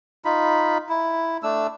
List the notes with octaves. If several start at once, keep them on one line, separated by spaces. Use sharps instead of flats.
D#4 F4 B5
E4
A3 D4 E6